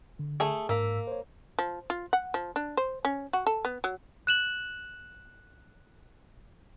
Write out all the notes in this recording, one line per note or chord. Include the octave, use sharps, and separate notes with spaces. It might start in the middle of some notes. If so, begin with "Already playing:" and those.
D3
A3 G#4
G#2 A#3 E6 B6
C5 C#5
F3
F4
F#5
F3
D4
C5
C#4
F#4
A4
B3
F#3
F#6 E7 F#7